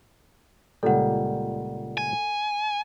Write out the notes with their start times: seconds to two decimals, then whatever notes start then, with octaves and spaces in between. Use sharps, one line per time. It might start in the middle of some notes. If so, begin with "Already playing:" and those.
0.83 C#2 A#2 G3 A4 F#5
1.97 G#5